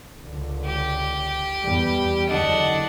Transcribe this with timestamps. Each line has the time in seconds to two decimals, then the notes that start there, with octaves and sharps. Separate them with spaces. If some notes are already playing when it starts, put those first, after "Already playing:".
0.19 C#2 D3
0.66 G4
1.63 E2 G3
2.29 F#1 D3 D4 D#5 F#5